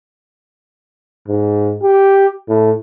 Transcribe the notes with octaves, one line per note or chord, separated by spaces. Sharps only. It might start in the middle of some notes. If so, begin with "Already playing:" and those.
G#2
G4
A2